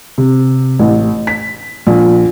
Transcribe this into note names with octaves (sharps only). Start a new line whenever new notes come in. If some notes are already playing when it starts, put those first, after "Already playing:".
C3
A1
B6
A#1